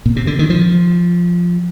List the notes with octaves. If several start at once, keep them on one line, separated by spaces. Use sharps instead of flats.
A#2
C3
D3
D#3
F3